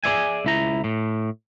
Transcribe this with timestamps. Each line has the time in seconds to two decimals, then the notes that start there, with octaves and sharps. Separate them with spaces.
0.04 G#4 C5 D5 E5 G#5
0.45 C#2 E4 A#5
0.84 A2